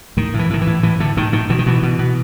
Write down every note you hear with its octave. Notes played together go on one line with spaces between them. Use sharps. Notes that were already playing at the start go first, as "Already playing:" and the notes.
A2 D#3
A2
E3
A2 D#3
E3
A2
A2 E3
A2 D3
A2 D#3
A2 D#3
B2 E3
D#3
B2 E3
B2
B2